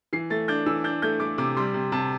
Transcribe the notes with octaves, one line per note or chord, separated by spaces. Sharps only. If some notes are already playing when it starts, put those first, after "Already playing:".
E3 C7
A3 A6
D4 G6
E3 E6
D4 G6
A3 G6
A3 D6
C3 D6
G3 C6
C3
C3 A5